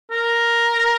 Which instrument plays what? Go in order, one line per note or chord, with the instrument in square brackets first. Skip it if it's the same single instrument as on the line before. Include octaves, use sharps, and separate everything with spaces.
[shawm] A#4